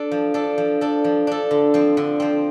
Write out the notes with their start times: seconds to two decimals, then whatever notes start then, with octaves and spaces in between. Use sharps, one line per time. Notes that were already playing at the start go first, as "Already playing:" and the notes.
Already playing: D4 A4
0.11 F3
0.34 D4 A4
0.58 F3
0.81 D4 A4
1.04 F3
1.27 D4 A4
1.51 D3
1.74 F3 C4
1.97 D3
2.20 F3 C4